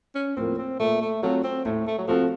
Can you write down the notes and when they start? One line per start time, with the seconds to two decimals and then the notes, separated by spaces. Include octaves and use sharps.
0.15 C#4
0.37 A2 F3 A#3 C4
0.58 C4
0.79 A#2 A3
1.02 A3
1.22 F#3 A3 C4 F4 A4
1.44 C4
1.65 A2 A3
1.87 A3
1.98 F#3
2.08 F3 A3 C4 F#4 A4